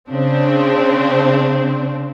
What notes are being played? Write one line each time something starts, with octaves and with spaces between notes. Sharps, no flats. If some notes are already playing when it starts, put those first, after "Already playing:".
C#3 C4 D4